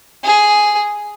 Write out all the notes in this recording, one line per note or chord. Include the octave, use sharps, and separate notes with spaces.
G#4